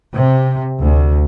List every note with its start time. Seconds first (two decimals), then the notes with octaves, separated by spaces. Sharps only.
0.14 C3
0.81 D2